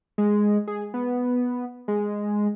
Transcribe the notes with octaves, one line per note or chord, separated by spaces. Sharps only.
G#3
G#4
B3
G#3